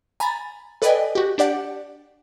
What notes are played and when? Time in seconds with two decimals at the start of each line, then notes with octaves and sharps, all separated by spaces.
0.20 G#5 A#5 B5 A6
0.82 A4 B4 D5 D#5 G5 G#5
1.15 F#4 G4
1.38 D4 G4 D5 F#5